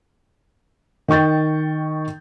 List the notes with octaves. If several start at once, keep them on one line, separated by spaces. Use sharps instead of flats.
D#3 G5 C#6 G6 A6